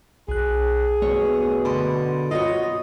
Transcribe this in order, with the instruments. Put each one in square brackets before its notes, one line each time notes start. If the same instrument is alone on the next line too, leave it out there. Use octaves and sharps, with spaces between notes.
[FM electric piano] B1 F#6 [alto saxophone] G#4
[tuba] B2 [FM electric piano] A3 [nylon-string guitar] C#5
[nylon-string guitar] D3 [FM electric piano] B5 C6
[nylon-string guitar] F4 F#4 C#5 [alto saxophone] D#5